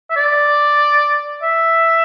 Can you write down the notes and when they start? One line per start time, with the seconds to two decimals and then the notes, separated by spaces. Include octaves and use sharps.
0.10 E5
0.16 D5
1.42 E5